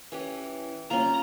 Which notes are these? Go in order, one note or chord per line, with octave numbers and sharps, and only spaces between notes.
E3 C#4 G4
G3 A#3 C#4 F4 A#5